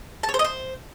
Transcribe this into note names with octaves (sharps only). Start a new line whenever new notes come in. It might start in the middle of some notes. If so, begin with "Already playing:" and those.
A5
C#5
C5
D#5
C5